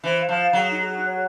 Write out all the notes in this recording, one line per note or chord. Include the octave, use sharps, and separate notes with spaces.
E3 C5
F5
F3
F5
F#3 G#4
D#4
G#4
C#5